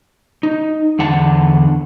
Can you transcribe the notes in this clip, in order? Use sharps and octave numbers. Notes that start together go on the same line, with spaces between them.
D#4
E2 D3 F#5 A5